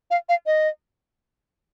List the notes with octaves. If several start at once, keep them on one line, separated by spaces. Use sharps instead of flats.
F5
F5
D#5